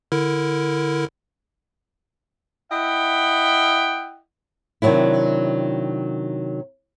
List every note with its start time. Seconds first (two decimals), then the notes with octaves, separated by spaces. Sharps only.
0.12 D3 E4 A#4
2.71 E4 D#5 E5 F#5 G5
4.82 C3 D#3 E3 F#3 D4 E4